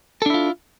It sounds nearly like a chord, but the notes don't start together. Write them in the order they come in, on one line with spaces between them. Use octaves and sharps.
A4 D4 E4 F4